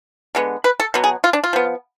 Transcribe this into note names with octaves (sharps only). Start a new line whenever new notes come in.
D3 G#3 B3
B4
A4
B2 F#3 B3
G#4
F4
D4
F4
F3 B3